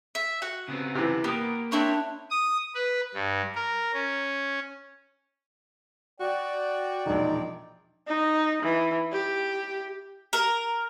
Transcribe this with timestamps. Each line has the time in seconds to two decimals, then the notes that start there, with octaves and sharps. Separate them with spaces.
0.15 E5
0.42 F#4 F#5
0.68 C#3 B3 C4
0.95 C3 E3
1.24 A#3 B3 G4 D#6
1.72 C4 D4 E4 C#5
2.30 D#6
2.75 B4
3.14 G2
3.55 A#4
3.93 C#4
6.20 F#4 D5 G5
7.06 E1 A#1 D#4
8.07 D#4
8.63 E3
9.12 G4
10.33 A#4